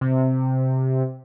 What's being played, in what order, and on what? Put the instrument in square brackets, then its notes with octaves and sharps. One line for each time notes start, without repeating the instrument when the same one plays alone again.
[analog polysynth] C3